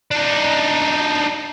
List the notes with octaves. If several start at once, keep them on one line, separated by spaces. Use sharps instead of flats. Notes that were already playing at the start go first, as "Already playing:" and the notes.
D4 D#4